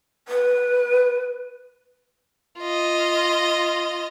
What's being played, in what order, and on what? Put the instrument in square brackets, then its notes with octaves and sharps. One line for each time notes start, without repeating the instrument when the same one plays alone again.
[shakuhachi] B4
[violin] F4 D#5